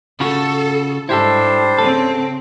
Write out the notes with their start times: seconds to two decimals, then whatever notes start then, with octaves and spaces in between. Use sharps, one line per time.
0.20 C#3 F4 F#4 A4
1.09 G#2 G3 D4 E4 G4 A4 C5
1.79 C#3 C4 A4